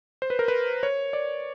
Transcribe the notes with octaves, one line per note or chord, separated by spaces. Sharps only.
C5
B4
A#4
B4
C#5
D5